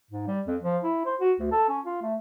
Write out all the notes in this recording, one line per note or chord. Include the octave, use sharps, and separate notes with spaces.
G#2
G3
F2
F3
E4
C5
F#4
D2
A4
C#4
F4
A3